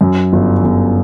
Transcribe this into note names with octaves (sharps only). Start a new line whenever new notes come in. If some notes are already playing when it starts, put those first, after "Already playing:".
F#2
G1
G1